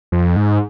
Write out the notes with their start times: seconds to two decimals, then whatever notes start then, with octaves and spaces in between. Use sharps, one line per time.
0.12 F2
0.36 G#2